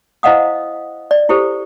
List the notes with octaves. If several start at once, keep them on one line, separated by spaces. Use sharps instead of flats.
E4 C5 D#5 F5 F#5 D#6
D5
E4 G4 A4 C5